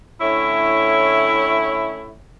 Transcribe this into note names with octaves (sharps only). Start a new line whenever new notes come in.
A2 D3 C#4 E4 C#5 E5